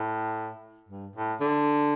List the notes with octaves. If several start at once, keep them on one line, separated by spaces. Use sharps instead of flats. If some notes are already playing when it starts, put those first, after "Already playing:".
Already playing: A2
G2
A2
D3